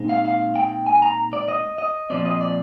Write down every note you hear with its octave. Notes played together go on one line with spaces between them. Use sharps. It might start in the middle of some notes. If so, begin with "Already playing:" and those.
Already playing: A#2 G#3 C4 D#4
F5
F5
G5
G#5
A#5
D5
D#5
D#5
A#2 F3 C4 D5
D#5
D5